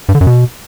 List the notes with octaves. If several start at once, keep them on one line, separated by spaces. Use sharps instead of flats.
G2
D3
F#2
B2